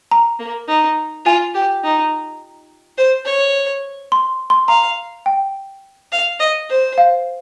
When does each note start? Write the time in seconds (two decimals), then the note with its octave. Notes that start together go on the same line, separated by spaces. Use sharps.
0.11 A#5
0.39 A#3
0.68 D#4
1.26 F4 G#5
1.55 G4
1.84 D#4
2.98 C5
3.25 C#5
4.12 C6
4.50 C6
4.68 F5 A#5
5.26 G5
6.12 F5
6.40 D#5
6.69 C5
6.98 F5